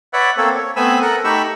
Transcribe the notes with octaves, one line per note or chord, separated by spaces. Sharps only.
B4 C#5 D5 E5 F#5
A#3 C4 A4 C#5
C#5
A3 B3 C4 G#5 B5 E6
A4 A#4 F#5
A3 D#4 G4 B5 C#6 E6